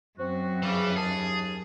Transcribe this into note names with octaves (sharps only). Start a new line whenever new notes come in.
F#2 C4 F#4
C#3 E3 G3
D#2 G#4 A5